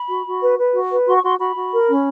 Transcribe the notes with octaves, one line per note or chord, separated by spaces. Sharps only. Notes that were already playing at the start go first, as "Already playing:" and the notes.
Already playing: B5
F#4
F#4
B4
B4
F#4
B4
F#4 C6
C#6
F#4 C6
F#4 B5
F#4
A#4
C#4